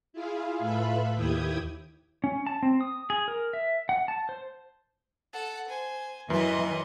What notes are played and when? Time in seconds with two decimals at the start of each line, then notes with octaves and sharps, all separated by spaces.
0.13 E4 F4 G#4 F5
0.59 A2 F4 A4 B4 E5 B5
1.15 D#2 E4 G4 G5 D#6 G#6
2.24 C#4
2.47 A5
2.63 C4
2.81 D#6
3.10 G#4
3.28 A#4
3.53 E5
3.89 F#5
4.08 A5
4.29 C5
5.33 A4 F#5
5.68 C5 G#5
6.30 F#2 E3 D#5 C6